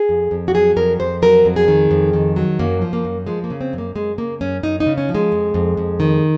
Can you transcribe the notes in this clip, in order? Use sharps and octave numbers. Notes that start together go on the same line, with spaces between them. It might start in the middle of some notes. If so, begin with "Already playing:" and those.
Already playing: G#4
F2
F2
F#4
F#3 G#4
F2 A#4
F2 C5
F#3 A#4
F2
G#4
D#3
F2
D#3
F#3
F#2 A#3
F3
A#3
F#2
F3 G#3
A#3
C#3
C4
F#2
A#3
F#2 G#3
C#3 A#3
F#2 C#4
F#2 D#4
D#4
C#3
C#4
F3
G#3
F2
F2
F2
D#3